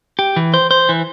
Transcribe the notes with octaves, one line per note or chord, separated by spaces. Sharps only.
G4
E3
C5
C5
E3